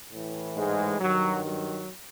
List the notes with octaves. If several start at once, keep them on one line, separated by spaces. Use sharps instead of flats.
A2 E3
G#2 G#3
G2 D#3 F#3
F#3